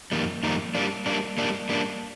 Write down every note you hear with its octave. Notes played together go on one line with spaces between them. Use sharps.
F2 D#3 G3 A#3
F2 D#3 G3 A#3
G3 A#3 D4
G3 A#3 D4
G3 A#3 D4
G3 A#3 D4